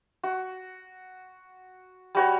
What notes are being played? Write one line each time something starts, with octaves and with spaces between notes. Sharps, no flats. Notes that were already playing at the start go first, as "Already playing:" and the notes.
F#4
G3 F#4 C#5